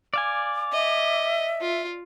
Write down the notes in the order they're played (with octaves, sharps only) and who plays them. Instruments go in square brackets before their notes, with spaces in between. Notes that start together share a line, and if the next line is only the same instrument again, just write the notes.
[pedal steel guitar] D5 F5 G#5 [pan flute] D6
[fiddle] D#5 [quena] E5
[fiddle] F4